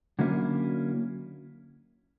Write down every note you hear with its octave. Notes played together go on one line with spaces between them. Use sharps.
D3 F#3 A#3 C#4 E4